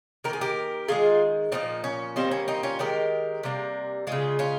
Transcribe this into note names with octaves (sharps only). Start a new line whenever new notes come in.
D#3 A#4
A#3 G#4
G4 A#4
D#3 G#3 F4 G#4
A#2 F3 A#3 C4 D#4
C#4
D#3 G3 A#3 C4
C#4
C4 D#4
C#4 F4
D#3 G#3 G4 A#4
C3 G3 A#3
C#3 G#3 F4 G#4
C#4 F4